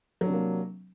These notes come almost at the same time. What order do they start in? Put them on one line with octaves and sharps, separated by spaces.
F#3 D4 C3 A#3